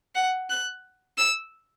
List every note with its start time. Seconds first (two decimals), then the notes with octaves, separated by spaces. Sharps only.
0.15 F#5
0.50 F#6
1.17 E6